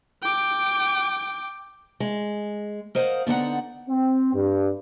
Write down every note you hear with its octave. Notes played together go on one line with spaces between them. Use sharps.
G5 D6
G#3
A#4 C5 D#5 F5 F#5
D3 B3 D#4 F#5
C4
G2